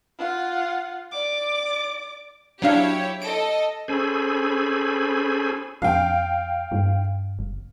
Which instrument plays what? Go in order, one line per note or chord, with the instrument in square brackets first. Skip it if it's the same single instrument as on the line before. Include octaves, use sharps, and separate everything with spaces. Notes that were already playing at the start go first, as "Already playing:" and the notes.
[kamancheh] F4 F#5
D5 D6
[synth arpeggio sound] F#3 D4 F5 [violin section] E4 G4 C#5
[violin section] A4 D#5 [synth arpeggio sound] D7
[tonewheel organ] C#4 G#4 A4 C5 G#5 B5
[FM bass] F2 [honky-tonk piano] F5 G5
[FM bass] G2
F#1